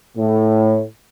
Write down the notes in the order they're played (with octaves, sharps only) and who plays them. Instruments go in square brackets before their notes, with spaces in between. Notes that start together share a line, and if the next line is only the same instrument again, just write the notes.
[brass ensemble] A2